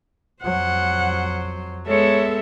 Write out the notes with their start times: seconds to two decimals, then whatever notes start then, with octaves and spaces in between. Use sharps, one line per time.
0.43 F2 F#3 C5 F#5
1.87 G#3 B3 A4 C#5 E5